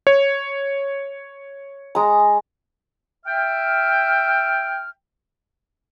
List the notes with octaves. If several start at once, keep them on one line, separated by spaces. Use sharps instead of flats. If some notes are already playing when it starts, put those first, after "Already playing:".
C#5
G#3 A#5
E5 G5 F6